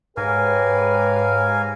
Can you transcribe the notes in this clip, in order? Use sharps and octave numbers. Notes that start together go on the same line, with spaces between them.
G#2 G4 A#4 B4 C#5 F5 G#5